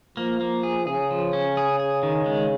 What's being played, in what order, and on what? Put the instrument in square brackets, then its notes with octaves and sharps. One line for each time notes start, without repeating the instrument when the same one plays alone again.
[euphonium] F3 [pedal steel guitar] A#3
[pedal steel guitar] A#3
G#4
[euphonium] C#3 [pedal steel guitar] G#4
[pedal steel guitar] F3
C#4
G#4
G#4
D#3
G#3